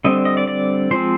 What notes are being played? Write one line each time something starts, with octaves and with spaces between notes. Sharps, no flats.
D3 G3 C4 D#5
D#5
D5
D5
F3 G#3 C4 C5